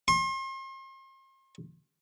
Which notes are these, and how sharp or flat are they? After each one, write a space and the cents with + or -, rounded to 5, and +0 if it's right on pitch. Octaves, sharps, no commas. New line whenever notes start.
C6 +40